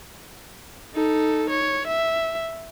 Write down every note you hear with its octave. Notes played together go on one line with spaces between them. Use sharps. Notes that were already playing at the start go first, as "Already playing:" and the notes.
D#4 A4
C#5
E5